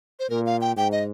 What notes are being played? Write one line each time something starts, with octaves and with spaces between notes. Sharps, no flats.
C5
A#2 A#4
F5
G5
G#2 G5
D#5